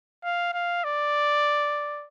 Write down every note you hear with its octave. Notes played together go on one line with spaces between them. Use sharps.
F5
F5
D5